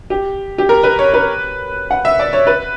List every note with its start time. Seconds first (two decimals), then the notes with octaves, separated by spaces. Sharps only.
0.10 G4
0.58 G4
0.69 A#4
0.83 B4
0.99 C#5
1.14 B4
1.91 F#5
2.05 E5
2.19 D5
2.33 C#5
2.47 B4